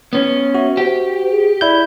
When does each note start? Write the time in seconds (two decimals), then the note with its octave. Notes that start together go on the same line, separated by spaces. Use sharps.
0.13 B3 C#4
0.55 F#4 E5
0.77 G4 C5
1.30 G#4
1.61 E4 D5 G6